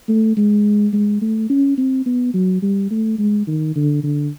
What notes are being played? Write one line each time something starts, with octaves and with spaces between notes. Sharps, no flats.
A3
G#3
G#3
A3
C#4
C4
B3
F#3
G3
A3
G#3
D#3
D3
D3